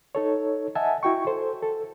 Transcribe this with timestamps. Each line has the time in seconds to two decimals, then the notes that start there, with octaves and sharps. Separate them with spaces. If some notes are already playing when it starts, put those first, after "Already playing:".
0.15 D#4 A4 C#5
0.75 D#5 E5 F#5 G#5 A5
1.03 E4 F#4 G5 C#6
1.27 A4 C5
1.62 A4